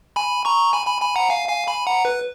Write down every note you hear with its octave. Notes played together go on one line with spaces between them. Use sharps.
G#5 B5
A#5 C#6
G#5 B5
G#5 B5
G#5 B5
F#5 A#5
F5 G#5
F5 G#5
G#5 B5
F#5 A#5
B4